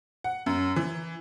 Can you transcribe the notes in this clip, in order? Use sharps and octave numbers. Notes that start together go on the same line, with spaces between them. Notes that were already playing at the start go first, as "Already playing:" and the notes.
F#5
F#2
E3